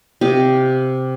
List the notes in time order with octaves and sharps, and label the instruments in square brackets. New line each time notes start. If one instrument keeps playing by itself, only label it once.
[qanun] C3 G4 D#5 F5